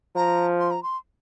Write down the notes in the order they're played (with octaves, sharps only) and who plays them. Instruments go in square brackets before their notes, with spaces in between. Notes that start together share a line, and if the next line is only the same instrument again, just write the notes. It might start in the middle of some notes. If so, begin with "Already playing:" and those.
[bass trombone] F3 [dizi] A#5
[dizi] C6
A#5
C6